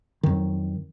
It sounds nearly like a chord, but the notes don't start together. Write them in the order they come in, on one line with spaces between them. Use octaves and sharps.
D#3 F2 F#3